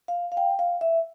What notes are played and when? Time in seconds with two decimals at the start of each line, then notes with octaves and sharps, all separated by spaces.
0.08 F5
0.32 F5
0.37 G5
0.59 F5
0.81 E5